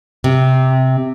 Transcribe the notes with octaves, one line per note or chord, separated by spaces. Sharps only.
C3